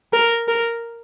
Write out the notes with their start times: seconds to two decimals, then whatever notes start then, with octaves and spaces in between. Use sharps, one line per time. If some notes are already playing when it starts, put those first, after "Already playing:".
0.13 A#4
0.48 A#4